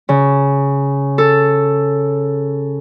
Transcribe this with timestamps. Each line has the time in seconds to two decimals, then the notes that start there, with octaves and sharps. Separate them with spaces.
0.09 C#3
1.18 A4